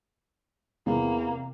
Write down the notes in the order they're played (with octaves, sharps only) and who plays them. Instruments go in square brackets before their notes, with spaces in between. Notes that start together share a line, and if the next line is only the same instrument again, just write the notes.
[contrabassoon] E2 [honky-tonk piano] C3 [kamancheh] A#3